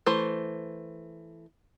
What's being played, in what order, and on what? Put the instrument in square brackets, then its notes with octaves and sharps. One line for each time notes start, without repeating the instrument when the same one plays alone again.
[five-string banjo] E3 A3 C5